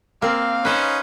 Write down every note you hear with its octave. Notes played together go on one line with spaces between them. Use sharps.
A#3 C4 F5
C#4 D#4 B4 C5